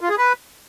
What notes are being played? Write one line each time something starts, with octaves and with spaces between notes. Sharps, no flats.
F4
G#4
B4